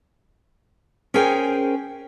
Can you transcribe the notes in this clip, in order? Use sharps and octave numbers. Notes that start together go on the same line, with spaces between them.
C#4 G#4 A#4 C5 G5 G#5